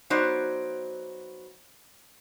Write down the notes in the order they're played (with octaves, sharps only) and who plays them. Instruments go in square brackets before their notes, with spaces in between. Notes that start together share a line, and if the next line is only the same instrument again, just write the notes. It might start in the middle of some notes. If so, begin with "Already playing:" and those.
[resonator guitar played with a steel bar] F#3 B3 D#4 C5 D5